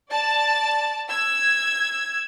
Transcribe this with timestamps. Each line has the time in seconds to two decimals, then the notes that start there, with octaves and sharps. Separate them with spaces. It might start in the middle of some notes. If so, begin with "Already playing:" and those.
0.11 D5 A5 A6
1.09 E6 G#6